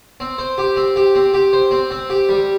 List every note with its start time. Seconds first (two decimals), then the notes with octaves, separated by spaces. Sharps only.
0.20 C4
0.38 C5
0.58 G4
0.76 C4
0.96 G4
1.15 C4
1.34 G4
1.53 C5
1.71 C4
1.91 C4
2.10 G4
2.29 G3